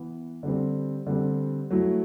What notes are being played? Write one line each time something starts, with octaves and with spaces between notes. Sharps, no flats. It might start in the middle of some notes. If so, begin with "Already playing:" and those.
Already playing: E3 B3 E4
D3 G3 C4
D3 G3 C4
F#3 A3 E4